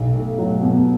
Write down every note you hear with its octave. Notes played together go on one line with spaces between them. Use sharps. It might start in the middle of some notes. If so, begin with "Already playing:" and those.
Already playing: B1
A3
F#3
B2